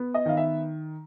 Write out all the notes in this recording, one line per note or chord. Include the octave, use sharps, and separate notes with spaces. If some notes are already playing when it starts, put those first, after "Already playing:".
Already playing: B3
D#5
D#3 F5
E5